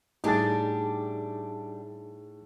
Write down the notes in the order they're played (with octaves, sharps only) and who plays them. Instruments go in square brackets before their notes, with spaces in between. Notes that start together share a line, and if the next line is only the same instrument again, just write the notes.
[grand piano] A2 A5 A6 [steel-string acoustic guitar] G3 D4 G4 [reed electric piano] D#4 G#4